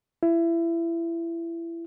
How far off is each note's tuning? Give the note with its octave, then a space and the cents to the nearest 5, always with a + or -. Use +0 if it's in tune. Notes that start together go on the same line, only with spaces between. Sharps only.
E4 +25